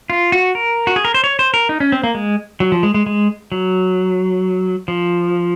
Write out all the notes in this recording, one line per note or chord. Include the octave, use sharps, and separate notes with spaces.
F4
F#4
A#4
F#4
G#4
A#4
C5
C#5
C5
A#4
D#4
C#4
C4
A#3
G#3
F#3
F3
G#3
G#3
G#3
F#3
F3